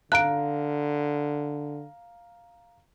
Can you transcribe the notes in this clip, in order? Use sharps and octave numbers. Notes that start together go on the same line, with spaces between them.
D3 F5 A#5 F#6 D7